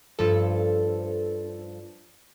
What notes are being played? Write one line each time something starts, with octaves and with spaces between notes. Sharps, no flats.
G2 F3 A4